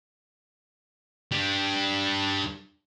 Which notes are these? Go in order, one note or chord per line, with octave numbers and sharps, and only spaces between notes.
G3 D4